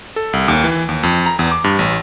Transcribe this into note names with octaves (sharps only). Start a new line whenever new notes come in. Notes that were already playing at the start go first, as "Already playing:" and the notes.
A4
C2
D#2
E3
D#2
F2
A#5
E2
D6
G2
A1